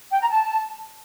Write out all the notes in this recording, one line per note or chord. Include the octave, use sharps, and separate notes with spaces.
G5
A#5
A5